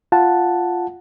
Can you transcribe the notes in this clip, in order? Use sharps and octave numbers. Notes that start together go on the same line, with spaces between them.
F4 F#5 A5